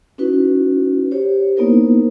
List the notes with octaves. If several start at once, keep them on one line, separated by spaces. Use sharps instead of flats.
C#4 D#4 E4 F#4 B4
G4 C5 C#5
A#3 B3 D#4 E4 A#4 C5